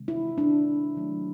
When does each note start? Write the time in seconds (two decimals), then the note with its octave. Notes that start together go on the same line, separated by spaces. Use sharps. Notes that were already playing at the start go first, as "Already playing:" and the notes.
Already playing: C3 D#3 G#3
0.08 E4
0.38 D4
0.95 D#3 F#3 A3